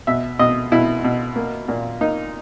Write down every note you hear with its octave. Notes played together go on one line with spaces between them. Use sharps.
B2 E5
B2 D#5
B2 E4
B2
A#3
A#2
A#3 D#4